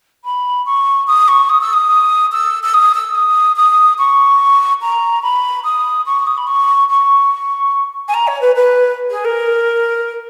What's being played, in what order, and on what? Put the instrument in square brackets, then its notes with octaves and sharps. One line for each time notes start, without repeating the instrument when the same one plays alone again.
[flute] B5
C#6
D#6
C#6
D#6
E6
D#6
E6
E6
D#6
E6
D#6
D#6
C#6
A#5
B5
D#6
C#6
D#6
B5
C#6
C#6
G#5
A#5
C#5
B4
B4
G#4
A#4